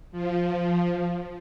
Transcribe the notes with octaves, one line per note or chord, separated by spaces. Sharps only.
F3